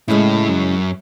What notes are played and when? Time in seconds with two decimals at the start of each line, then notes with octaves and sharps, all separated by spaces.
0.08 A2 C#3 G#3 C#4 E4
0.49 F#2